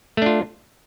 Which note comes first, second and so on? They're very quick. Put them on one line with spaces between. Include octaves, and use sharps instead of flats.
A3 D4 F4